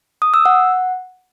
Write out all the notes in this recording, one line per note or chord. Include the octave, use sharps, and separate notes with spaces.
D#6
E6
F#5